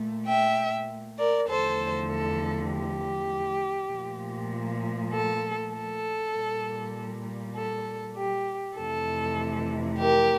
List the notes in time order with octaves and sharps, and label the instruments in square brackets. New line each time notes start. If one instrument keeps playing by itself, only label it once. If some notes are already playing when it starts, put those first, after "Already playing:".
Already playing: [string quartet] A#2 A3
E5 G5
A#4 D5
E2 D3 F3 A3 A4 C5
A4
G4
A#2 F3 A3
A4
A4
A#2 G3
A4
G4
F2 C3 E3 A3 A4
G4 A#4